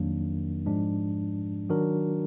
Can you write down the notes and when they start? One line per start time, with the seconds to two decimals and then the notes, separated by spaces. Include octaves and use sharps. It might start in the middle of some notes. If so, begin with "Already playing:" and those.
Already playing: F2 D#3 F#3 A#3 D4
0.66 G#2 F3 G#3 D4
1.69 D#3 F#3 D4 F#4 A#4